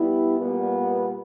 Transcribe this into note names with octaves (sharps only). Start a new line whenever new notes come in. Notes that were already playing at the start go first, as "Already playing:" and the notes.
Already playing: G3 B3 E4
A#2 G3 B3